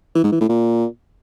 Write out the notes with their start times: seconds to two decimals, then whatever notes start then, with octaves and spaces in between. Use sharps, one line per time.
0.15 E3
0.24 G#2
0.32 E3
0.41 A2
0.49 A#2